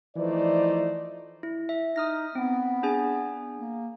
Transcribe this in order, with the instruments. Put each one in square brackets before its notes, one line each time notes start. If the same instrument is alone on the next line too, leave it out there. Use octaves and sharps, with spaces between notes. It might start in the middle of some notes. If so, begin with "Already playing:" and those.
[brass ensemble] E3 F3 A3 D#4 C5 D5
[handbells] E4
E5
[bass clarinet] D#4 [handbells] D#6 F6 A#6
[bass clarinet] B3 [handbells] C4
[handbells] D4 G#4 G#5
[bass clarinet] A#3